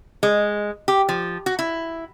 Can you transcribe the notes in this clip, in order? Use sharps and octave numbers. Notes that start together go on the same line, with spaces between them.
G#3
G4
F3
F#4
E4